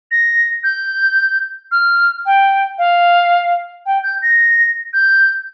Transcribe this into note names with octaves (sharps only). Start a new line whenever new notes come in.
A#6
G6
F6
G5
F5
G5
G6
A#6
G6